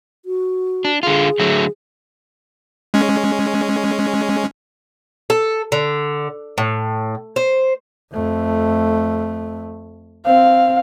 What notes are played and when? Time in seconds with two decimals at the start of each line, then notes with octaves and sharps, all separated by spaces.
0.25 F#4
0.85 D4
1.03 D3 F4 G#4
1.39 D3 F#3 A3
2.94 G#3 C#4
5.30 A4
5.72 D3
6.58 A2
7.36 C5
8.13 F2 A3
10.26 C4 F5